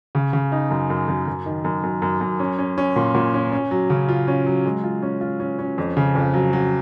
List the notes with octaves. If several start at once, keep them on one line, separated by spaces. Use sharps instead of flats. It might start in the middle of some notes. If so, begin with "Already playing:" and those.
C#3
C#3
D#4
F#2
F#2
F#2
F#2
D#3
F#2
F#2
F#2
F#2
C#4
C#4
C#4
A#2
A#2
C#4
C#4
F#3
C#3
F4
C#4
F#3
G#3
F4
C#4
F4
C#4
C#4
F2
C#3
F2
F#3
F#3